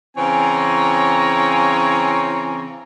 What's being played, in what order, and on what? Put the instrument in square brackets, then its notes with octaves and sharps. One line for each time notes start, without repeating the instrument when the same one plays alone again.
[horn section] C#3 E3 C4 C#5 G#5 A#5